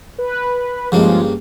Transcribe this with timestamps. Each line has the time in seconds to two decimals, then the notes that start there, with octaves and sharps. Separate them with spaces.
0.18 B4
0.92 G2 C#3 F3 G#3 A#3